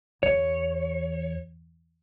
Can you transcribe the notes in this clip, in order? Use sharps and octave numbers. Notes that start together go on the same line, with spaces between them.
E2 C#5